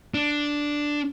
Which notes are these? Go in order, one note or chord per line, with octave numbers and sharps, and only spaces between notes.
D4